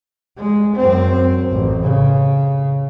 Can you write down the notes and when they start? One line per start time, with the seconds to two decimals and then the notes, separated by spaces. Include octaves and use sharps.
0.37 G#3
0.76 F#2 C4
1.50 A1
1.83 C#3